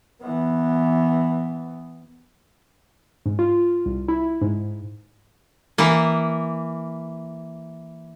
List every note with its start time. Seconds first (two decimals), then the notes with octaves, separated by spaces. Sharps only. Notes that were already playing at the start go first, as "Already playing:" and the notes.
0.23 E3 B3
3.26 G#2
3.39 F4
3.86 C2
4.08 E4
4.42 G#2
5.78 E3 A#3